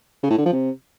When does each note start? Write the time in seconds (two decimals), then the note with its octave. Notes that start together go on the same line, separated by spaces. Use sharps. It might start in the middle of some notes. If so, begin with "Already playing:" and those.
0.23 C#3
0.31 A2
0.38 D3
0.45 F3
0.53 C3